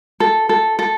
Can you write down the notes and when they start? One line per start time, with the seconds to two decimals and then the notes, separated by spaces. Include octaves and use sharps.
0.20 A4
0.49 A4
0.79 A4